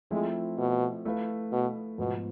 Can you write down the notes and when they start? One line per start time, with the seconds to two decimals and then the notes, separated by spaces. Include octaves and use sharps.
0.11 F3 G#3 A3 C4 E4
0.58 B2
1.05 A3 E4 B4 F5
1.52 B2
1.98 G#2 B2 F3 B3